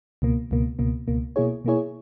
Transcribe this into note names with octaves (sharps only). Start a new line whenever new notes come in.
C#2 B2 A#3
C#2 B2 A#3
C#2 B2 A#3
C#2 B2 A#3
B2 A#3 E4 G#4 C#5
B2 A#3 E4 G#4 C#5